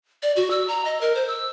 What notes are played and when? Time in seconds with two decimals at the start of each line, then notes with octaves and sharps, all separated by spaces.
0.23 D5
0.37 F#4
0.51 E6
0.68 A#5
0.85 D#5
1.01 A#4
1.15 C5
1.28 E6